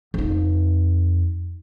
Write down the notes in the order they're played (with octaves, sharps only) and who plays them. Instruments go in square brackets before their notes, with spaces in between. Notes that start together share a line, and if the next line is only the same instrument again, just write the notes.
[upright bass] F2 D#4